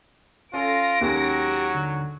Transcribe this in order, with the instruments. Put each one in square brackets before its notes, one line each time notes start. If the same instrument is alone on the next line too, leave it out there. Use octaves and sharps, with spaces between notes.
[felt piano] C#4 A4 [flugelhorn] F4 [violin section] A#6 D7
[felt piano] D#2 G#3 C#4 [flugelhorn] F#3 [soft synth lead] G4
[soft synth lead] D3